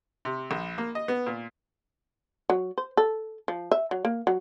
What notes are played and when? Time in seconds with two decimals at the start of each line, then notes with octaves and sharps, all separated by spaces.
0.25 C3
0.51 A#1
0.78 A#3
0.95 D#5
1.08 B3
1.27 A#2
2.50 F#3
2.78 C5
2.97 A4
3.48 F3
3.71 E5
3.91 F#3
4.05 A#3
4.27 F#3